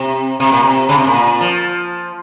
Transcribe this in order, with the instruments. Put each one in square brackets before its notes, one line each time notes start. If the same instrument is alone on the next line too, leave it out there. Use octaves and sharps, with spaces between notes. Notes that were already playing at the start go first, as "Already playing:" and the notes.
Already playing: [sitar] C3
C3
A#2
C3
C#3
C3
A#2
F3